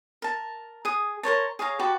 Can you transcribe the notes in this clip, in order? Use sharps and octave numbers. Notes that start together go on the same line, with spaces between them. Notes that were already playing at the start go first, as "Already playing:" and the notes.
A#4 A5
G#4 D#6
A#4 C5 C#5 A5
G#4 C#5 F5 A#5
F#4 G4 B4 A5